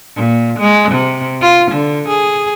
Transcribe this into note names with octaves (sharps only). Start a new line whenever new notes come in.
A#2
G#3
C3
F4
D3
G#4